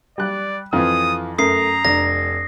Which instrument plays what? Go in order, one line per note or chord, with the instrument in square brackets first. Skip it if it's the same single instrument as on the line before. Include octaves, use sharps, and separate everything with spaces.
[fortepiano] G3 F#6 [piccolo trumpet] D5
[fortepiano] F2 C4 [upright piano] E3 F4 [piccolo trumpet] D#6
[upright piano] F#2 [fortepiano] A3 A#4 [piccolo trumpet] A#5 [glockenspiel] D#6 C7
[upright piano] F1 [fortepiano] D4 [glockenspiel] A#6